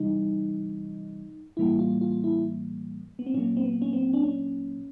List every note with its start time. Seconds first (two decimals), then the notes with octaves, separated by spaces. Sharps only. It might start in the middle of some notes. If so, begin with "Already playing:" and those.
Already playing: C3 E3 G3 D#4
1.57 A2 E3 G3 A#3 E4
1.79 F4
2.01 F4
2.24 E4
3.19 B3
3.26 C4
3.34 A#2 F#3 A#3 C#4
3.57 C4
3.64 B3
3.82 C#4
3.93 C4
4.13 D4
4.23 C#4